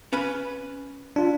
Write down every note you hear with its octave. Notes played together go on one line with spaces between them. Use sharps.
C#4 B4 B5
D4 F4